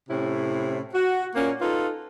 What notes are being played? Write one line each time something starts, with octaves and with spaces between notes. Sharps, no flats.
A2 C3 C#4 E4
F#4
A#2 A#3 C#4
D#4 F4 A4 B4